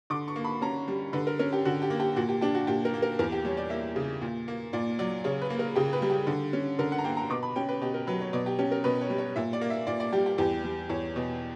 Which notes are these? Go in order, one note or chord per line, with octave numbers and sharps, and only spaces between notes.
D3 D6
C#6
A#3
B5
C#4 A#5
G3
D3 B4
A#4
C#4 A#4
G4
D3 F#4
G4
A#3
G4
A#2 F#4
G4
D4 G4
F#4
A#2 G4
A#4
A#3
A#4
E2 A#4
G4
G3 C#5
D5
A#3 E5
C#3
A#2
A#3
A#2 D5
F#3 D5
C#3 C#5
B4
A#3
A#4
C#3 G4
B4
G3
G4
D3
C#4
D3 A#4
F#5
A#5
A#3 G5
A#5
B2 D6
B5
C#4 G5
B4
B2 G4
A#4
F#3 B4
C#5
B2 D5
G4
C#4 G4
A#4
B2 B4
C#5
G3
C#5
A#2 E5
D5
A#3
E5
A#2 D5
D5
G3 G4
G4
E2 G4
G3
E2 C#5
B2